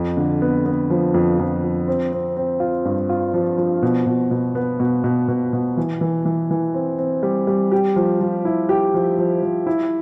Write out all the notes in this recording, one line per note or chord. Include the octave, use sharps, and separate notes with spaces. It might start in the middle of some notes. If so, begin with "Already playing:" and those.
Already playing: F2
D3
B3
B3
F3
F2
F2
F3
C4
C4
C4
F4
G2
F4
F3
F3
B2
B2
B2
B3
B2
B2
B2
B2
E3
E3
E3
E3
C4
C4
G3
G3
G4
F3
F3
E4
G4
F3
F3
F3
E4